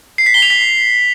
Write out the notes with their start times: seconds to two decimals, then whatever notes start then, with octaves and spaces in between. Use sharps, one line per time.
0.18 C7
0.26 B6
0.34 G7
0.42 F7
0.50 B6